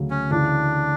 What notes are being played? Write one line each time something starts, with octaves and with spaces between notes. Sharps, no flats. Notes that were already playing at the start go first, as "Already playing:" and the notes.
Already playing: D2 C#3 F#3
C#4
D2 C#3 E3 D4